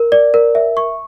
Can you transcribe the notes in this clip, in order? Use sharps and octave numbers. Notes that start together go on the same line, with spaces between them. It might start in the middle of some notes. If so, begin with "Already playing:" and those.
Already playing: A#4
D5
A#4
E5
C#6